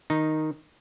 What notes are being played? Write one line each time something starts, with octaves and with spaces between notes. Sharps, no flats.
D#3 D#4